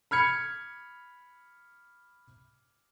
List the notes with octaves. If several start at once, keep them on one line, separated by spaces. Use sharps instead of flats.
B5 F6 G#6 C#7